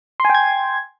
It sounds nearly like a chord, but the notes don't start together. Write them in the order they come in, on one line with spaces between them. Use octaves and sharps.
C6 G#5 G5 G#6